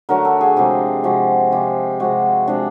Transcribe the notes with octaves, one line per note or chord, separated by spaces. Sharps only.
D3 F#3 A3 A#4
A4
G#4
C3 F3 G#3 G4
C3 F3 G#3 F#4
C3 F3 G#3 G4
C3 F3 G#3 F#4
C3 F3 G#3 D4